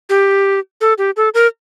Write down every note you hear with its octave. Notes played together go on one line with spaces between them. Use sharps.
G4
A4
G4
A4
A#4